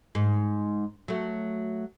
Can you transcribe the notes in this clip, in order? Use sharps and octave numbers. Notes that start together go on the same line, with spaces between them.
G#2
F#3 A3